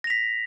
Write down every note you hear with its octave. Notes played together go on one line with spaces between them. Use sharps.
A#6 B6 F7